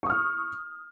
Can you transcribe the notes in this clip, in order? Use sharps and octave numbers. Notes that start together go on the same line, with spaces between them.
C#6 D#6 F6